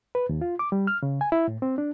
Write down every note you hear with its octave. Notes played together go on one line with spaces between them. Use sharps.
B4
D#2
F4
D6
G3
F6
C#3
G#5
E4
A2
C4
D4